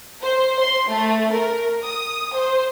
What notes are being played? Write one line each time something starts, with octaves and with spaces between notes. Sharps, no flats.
C5
C6
A3
A#4
D#6
C5